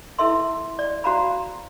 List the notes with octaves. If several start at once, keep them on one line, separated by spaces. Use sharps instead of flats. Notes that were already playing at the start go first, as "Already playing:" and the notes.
E4 A4 B4 E5 C6
D5
F#4 C5 F5 A#5 B5